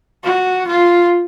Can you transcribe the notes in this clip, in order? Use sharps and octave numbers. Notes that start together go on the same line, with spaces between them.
F#4
F4